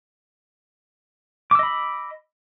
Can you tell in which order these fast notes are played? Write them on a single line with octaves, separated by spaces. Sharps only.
D6 E6 D#5 B5